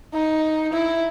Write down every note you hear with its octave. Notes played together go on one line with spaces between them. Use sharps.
D#4
E4